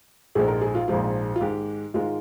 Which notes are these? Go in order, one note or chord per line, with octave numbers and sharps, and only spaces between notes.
A#1 G#2 F3 G#3 G#4
A#4
G#4
F4
A#1 G#2 F3 G#3 F4
F4
G#2 D#3 G#3 G4
G#2 D#3 G#3 F4